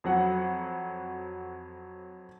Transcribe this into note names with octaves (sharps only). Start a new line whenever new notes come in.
F2 F#3 F#5